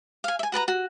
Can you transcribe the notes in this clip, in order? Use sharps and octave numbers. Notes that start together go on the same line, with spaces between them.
F5 G#5
E5 G#5
F#4 B4 A5 A#5
F#4